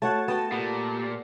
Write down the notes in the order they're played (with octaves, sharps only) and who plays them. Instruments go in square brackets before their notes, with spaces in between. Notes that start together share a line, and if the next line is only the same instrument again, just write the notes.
[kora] A3 F#4 F#5 [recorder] C#5 [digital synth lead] A5
[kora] B3 G5 [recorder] F#4 [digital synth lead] A5
[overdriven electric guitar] A#2 [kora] B3 [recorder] G4